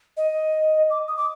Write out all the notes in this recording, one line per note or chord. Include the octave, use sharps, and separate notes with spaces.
D#5
D6
D#6
D6